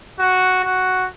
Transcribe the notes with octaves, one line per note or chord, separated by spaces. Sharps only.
F#4
F#4